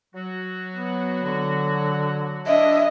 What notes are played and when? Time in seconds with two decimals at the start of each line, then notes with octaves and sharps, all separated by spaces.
0.15 F#3 F#4
0.75 B3
1.23 D3
2.47 D4 D#5 E5